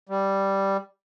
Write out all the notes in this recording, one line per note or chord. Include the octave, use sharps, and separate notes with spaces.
G3